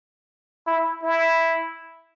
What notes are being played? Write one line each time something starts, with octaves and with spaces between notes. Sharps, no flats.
E4
E4